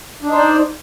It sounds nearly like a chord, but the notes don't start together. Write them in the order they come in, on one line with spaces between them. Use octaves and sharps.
D4 D#4 C5 D5